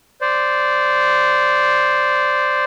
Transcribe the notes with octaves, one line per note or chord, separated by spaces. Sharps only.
C5 D5